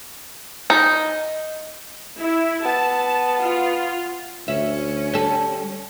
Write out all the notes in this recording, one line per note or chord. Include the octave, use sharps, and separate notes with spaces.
D#4
E4
B3 A5
F4
D2 C#4 E5
G3 A4